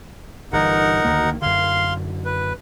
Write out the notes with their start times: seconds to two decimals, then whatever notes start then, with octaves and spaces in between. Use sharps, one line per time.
0.53 G1 E3 D#4 A#4 F#5
1.04 D2 D#3 A#3
1.42 F#2 D3 F5 C6
2.25 B4